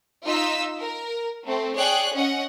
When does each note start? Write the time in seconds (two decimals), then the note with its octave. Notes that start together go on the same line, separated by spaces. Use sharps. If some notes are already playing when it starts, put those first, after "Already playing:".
0.25 D#4 F4 E6 B6
0.79 A#4
1.45 A3 C4
1.76 G#4 C#5 D5 G5 F#6
2.15 C#4 D#5 F#5